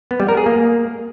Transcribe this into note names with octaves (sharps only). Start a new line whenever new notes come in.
B3
G3
A#4
G#4
A#3